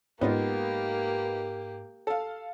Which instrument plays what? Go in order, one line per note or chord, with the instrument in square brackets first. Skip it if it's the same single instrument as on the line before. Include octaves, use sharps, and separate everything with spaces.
[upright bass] G#2 [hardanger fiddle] A#3 G4 [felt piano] B3 D#4 F4
[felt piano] A4 F5